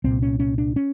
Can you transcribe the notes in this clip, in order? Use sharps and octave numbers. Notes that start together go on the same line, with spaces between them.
C2 A#2 C4
C#4
C#4
D4
C#4